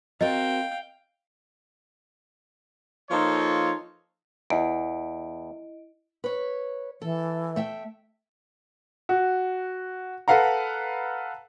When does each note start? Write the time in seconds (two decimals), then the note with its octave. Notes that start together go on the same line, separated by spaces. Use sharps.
0.21 C4 F#4 A#4 D#5 F5 G5
3.10 F3 A#3 D#4 F4 A4 C#5
4.50 E2 E4 D#5 D7
6.24 B4 C#5
7.02 E3 A4
7.56 A3 E5 G5
9.09 F#4
10.28 A4 B4 F5 F#5 A#5